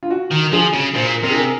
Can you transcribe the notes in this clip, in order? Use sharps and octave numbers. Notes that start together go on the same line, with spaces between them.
F4
F#4
D#3
F3 G#4
C#3
A#2 C5
C3 A#4
G#4
A#4